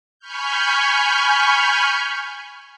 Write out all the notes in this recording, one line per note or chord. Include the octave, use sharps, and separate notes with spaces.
G#5 B5 C#6 F6 G6